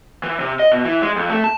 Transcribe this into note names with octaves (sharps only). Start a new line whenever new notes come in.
E3
C3
D#5
B2
E3
G#3
F2
A3
A5